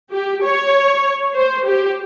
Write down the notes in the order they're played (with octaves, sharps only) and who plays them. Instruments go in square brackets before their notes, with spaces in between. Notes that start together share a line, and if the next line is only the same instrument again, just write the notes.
[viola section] G4
C#5
C5
G4